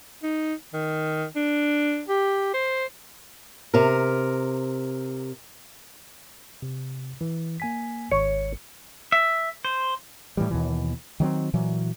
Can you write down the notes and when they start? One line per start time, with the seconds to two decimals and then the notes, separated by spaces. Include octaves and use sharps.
0.23 D#4
0.73 D#3
1.36 D4
2.09 G4
2.54 C5
3.74 C3 A#4
6.62 C3
7.21 E3
7.60 A#3 G#5 B6
8.11 G#1 C#5 C#7
9.12 E5
9.65 C5
10.37 A2 E3 G3
10.50 D#2 B2 E3
11.20 D#3 F#3 B3 C4
11.53 A#2 E3 F#3